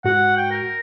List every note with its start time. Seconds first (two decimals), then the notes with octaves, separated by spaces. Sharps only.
0.04 G#2 F#4 F#5
0.37 G5
0.51 A#4